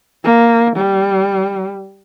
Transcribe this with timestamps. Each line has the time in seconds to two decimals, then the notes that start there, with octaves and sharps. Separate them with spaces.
0.24 A#3
0.77 G3